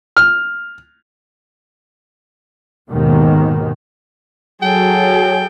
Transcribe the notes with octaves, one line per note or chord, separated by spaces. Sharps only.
F6
D#2 G#2 B2 D#3
F#3 G#4 A4 G5